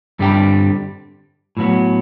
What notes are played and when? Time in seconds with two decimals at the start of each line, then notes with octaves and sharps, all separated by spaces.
0.19 G2 D3 G3 C4 G4
1.57 A2 F#3 B3